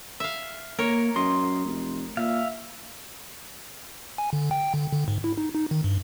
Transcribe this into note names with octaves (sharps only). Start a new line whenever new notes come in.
E5 F5
A#3 A#4 C#5
F#2 D#5 C6
F1
A#2 E5 F5
G#5
D3
G5
D3
D3
G#2
E4
D#4
D#4
D#3
G2